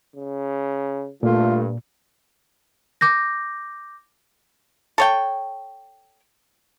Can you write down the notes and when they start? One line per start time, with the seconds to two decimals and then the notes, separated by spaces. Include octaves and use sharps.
0.16 C#3
1.23 G2 A#2 A3 F4
3.01 D6 G6 A#6
4.98 A4 C#5 G5